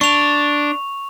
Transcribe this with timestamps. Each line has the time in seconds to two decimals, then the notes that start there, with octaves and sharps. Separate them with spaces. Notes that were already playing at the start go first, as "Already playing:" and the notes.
0.01 D4 C#6 F7